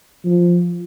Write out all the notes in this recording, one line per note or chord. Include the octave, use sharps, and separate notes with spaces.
F3